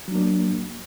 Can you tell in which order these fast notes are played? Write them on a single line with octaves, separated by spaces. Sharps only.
F#3 D4 A#3